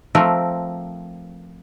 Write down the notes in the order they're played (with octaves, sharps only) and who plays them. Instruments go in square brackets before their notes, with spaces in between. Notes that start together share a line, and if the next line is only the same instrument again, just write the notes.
[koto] F3 A3 C4 A#4